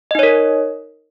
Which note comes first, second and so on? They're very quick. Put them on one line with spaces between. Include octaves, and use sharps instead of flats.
D#5 D#4 C#5 A#4